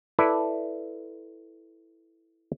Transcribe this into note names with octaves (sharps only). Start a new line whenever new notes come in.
E4 A4 B4 D5